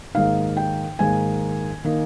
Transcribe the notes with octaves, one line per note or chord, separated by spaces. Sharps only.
G#2 D#3 A#3 D#4 F5
G5
G#2 D#3 A#3 D#4 G#5
D#3 A#3 D#4